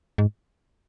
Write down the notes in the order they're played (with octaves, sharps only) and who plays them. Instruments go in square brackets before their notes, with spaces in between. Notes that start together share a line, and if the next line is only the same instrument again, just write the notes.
[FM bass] G#2